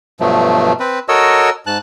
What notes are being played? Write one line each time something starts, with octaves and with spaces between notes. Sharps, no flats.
G2 B2 F3 F#3 A3
C4 B4
F#4 A4 A#4 C#5 D#5 E6
G#2 A5 F#6